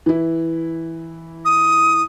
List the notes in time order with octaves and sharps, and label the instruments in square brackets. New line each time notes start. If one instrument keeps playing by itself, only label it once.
[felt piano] E3 E4
[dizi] D#6